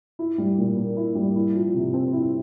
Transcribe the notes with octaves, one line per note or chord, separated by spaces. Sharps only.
E4
G3
A#2
A#3
E4
G3
E4
F3
C3
C4
E4